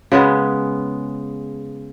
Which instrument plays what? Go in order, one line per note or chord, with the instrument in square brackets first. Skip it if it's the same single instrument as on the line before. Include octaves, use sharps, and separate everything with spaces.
[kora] C#3 G#3 B3